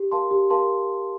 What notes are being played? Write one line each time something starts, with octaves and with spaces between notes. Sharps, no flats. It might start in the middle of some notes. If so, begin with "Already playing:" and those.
Already playing: G4
A#4 F5 A5 C6
G4
A#4 F5 A5 C6